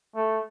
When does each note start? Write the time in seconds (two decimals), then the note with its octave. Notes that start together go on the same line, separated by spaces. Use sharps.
0.15 A3